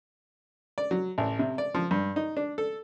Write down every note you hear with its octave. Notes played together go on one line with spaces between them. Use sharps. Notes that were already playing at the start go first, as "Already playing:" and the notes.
D5
F#3
A1
C3
D5
F3
G2
D#4
D4
A4